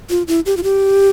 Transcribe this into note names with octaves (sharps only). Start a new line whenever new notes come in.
F4
E4
G4
F4
G4